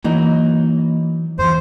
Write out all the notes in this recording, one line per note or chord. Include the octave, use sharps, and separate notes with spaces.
E3 F#3 A#3 D#4
F2 E3 C5